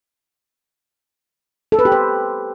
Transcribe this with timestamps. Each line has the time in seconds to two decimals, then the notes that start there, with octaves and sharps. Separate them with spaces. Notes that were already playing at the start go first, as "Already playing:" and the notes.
1.72 A4
1.79 B4
1.85 G4
1.92 C5